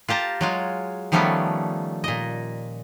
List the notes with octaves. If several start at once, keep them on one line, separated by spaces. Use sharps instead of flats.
F4 G4 A5 A#5
F#3 G#3 F4
D#3 F3 G3 A3 B3 C#4
A#2 D#5